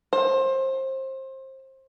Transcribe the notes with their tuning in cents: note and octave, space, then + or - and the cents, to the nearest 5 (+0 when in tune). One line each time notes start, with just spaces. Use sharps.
C5 +25